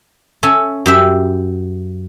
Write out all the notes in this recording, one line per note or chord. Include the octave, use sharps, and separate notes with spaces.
C#4 A4 E5 G#5
F#2 G4 E5